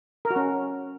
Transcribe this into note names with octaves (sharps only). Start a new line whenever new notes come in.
A#4
F#4
C#4